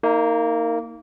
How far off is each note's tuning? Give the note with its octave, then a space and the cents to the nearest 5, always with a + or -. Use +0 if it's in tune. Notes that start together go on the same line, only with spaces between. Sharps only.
A#3 -15 D#4 +25